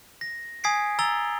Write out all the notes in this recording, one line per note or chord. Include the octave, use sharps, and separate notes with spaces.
A#6
G#5 D#6 G#6 B6 C7 D7
A#5 E6 A6 D7 F7 G7